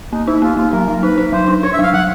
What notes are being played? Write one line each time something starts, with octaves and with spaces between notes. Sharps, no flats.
A#3 D#4
D#4 E4
A#3 F4
A#3 F4
F#3 A#4
F#3
D#4 B4
D#4
F#3 C5
D4
D4 C#5
E5
F#3 F5
F#3 F#5